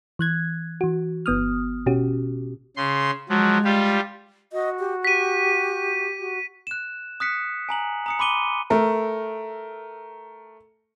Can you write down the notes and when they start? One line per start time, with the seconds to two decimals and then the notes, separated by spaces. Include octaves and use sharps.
0.19 E3 F#6 G#6
0.81 E3 F#4
1.26 G1 B3 D#6 F6
1.86 B2 C#4 F#4 G4
2.77 C#3 C6
3.29 F3 F#3 G#3
3.64 G3 F4 G4
4.53 F#4 D#5
4.79 G4
5.05 G4 B6 D#7
6.19 F#4
6.67 F#6 E7
7.20 D#6 F#6 B6 C#7
7.69 G#5 A#5 F#7
8.06 A#5 D#6 C#7
8.19 B5 C6 D6 D#7 G7
8.70 A3 A#4